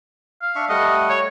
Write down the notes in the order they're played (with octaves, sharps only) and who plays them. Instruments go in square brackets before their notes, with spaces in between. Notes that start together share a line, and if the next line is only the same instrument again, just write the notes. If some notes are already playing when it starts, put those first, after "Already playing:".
[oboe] F5
[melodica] D4 E5 C#6
[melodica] G3 A3 F#5 [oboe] D#5
[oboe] C#5